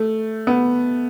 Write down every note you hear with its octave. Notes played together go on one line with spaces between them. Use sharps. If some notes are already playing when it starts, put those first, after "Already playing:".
Already playing: A3
B3